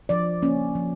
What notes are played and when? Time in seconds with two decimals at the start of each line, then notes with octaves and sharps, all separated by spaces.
0.09 F3 D5
0.42 A#3 C#4
0.75 F3